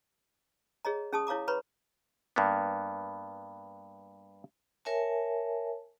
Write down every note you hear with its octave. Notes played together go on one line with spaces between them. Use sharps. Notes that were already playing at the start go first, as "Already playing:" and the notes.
G#4 C#5 D#5 A#5
C#4 G#4 A5 C#6 D#6
E4 C#5 F5 A#5 D6
B4 C#5 A#5 B5 C#6
G2 A#3 B3
A#4 C#5 E5 G#5 A5